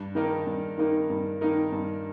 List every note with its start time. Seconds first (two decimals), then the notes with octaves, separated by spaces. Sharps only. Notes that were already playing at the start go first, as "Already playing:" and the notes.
Already playing: G2
0.15 D#3 A#3 D#4 A#4
0.47 G2
0.78 D#3 A#3 D#4 A#4
1.10 G2
1.41 D#3 A#3 D#4 A#4
1.72 G2